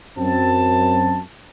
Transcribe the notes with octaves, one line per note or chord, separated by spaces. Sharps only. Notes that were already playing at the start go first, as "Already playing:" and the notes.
F#2 C4 A5